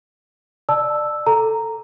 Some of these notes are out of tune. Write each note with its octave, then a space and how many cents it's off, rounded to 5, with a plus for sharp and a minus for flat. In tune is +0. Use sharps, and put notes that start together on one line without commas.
D5 +30 A5 +0 E6 +0
A4 +5 A#5 -10